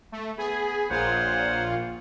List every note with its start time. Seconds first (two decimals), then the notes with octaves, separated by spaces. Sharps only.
0.12 A3
0.38 B3 G#4 B5
0.90 A#1 A#2 F4 C5 C#5 F#5